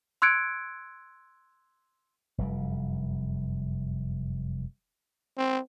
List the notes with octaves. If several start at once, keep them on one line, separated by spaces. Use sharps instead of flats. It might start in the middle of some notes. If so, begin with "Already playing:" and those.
C6 E6 F#6 G#6 C#7 D7
F1 F#2 G3
C4